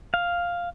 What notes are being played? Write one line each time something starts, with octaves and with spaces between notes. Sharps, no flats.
F5